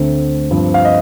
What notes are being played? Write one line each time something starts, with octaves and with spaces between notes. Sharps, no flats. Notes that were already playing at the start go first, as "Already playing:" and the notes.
Already playing: D2 D3 A3 C4
G2 F3 C4
F5
D#5